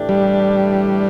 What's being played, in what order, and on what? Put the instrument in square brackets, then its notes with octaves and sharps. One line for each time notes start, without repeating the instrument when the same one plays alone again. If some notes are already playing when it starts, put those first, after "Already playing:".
Already playing: [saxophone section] A2 E3 A3 D4 G4
[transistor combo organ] G3